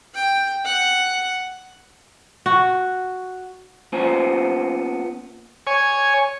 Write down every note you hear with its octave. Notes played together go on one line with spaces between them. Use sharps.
G5
F#5
F#4
A#3 B3 C#4 F4 C5 G#5
C#5 G#5